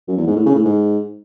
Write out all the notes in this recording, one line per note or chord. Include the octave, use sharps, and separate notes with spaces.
F#2
E2
G#2
A2
C#3
A2
G#2